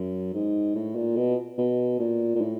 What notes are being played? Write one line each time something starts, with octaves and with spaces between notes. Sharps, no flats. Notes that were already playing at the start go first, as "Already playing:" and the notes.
Already playing: F#2
G#2
A2
A#2
B2
B2
A#2
A#2
A2